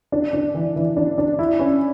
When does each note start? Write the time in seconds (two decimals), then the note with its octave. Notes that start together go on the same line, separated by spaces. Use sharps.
0.12 D4
0.33 D4
0.55 E3
0.76 E3
0.97 D4
1.18 D4
1.39 E4
1.59 C#4